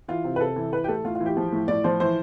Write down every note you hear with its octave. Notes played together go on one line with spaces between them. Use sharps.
E3 F4
C3
B4
C3 A4
E3
E3 B4
G4
A2 A4
A2 F4
F4
E3
G4
F3
A2
A2 D5
F3 C5
E3 C5